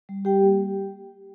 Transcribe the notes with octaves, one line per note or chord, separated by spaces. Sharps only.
G3
G3 G4 G5
A#3